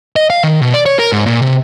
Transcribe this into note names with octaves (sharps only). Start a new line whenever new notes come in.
D#5
F5
D#3
B2
D5
C#5
A#4
G#2
A#2
C3